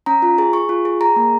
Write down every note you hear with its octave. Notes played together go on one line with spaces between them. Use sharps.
C#4 A#5
F4
G#4
G#4 C#6
F4
G#4
G#4 A#5
A#3